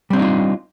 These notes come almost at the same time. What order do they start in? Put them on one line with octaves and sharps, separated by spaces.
G3 C4 D4 D#4 F4